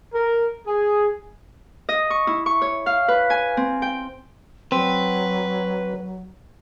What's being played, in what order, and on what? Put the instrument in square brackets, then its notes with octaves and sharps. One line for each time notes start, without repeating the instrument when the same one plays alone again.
[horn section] A#4
G#4
[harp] D#5
C#6
E4
C#6
C#5
F5
B4
G#5
C4
G5
[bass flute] F#3 [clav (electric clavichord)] C4 [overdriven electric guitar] B4